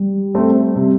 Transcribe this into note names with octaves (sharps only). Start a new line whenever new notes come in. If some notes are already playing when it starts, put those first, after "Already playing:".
Already playing: G3
A3 C4
C3